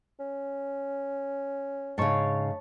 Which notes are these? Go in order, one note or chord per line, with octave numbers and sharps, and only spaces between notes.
C#4
G#2 C#3 C#5 A5